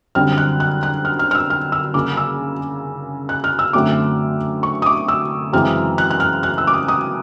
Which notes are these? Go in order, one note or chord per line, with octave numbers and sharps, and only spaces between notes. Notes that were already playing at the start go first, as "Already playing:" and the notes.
F#2 D3 G3 C4 F6
F#6
F#6
F#6
F6
F6
F6
E6
F6
E6
C#3 F#3 A#3 D6
E6
F#6
F6
E6
F#2 D3 F#3 A3 C4 D6
C#6
D#6
D6
E6
F#2 C#3 E3 G#3 C4 F6
F#6
F#6
F6
F#6
E6
D6
D#6
D#6